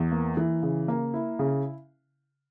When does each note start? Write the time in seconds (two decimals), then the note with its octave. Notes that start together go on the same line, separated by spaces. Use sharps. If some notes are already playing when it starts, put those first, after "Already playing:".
Already playing: E2
0.12 A#3
0.37 E3
0.63 C#3
0.88 A#3
1.14 E4
1.39 C#3